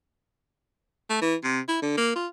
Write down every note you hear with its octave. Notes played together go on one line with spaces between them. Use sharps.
A3
E3
C3
E4
D3
A#3
F4